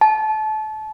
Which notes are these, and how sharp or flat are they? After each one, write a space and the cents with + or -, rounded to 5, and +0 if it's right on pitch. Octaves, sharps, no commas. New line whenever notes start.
A5 -30